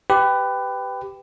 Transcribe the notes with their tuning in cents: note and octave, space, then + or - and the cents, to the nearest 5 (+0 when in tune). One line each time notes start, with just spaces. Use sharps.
G4 +0 B4 +20